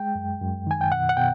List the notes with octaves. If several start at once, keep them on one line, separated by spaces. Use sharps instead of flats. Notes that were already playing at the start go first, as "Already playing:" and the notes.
Already playing: G#3 G5
F#2
F#2
D#3 G#5
G5
B2 F#5
F#5
B2 G5